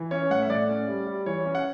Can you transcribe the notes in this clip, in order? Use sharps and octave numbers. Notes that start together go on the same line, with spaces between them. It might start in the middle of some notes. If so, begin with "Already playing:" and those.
Already playing: E3
C#4 C#5
A2 F#5
E5
A2 D5
C#4
G3
G3
E3 C#5
C#4
F#5